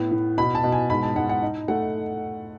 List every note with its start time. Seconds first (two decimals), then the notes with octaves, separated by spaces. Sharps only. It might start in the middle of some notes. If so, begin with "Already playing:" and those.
Already playing: A2 B3
0.11 A2
0.38 B2 B5
0.55 A5
0.64 B2
0.72 G#5
0.90 G#2 B5
1.03 A5
1.16 G#2 F#5
1.29 F#5
1.42 D#4
1.68 A3 F#5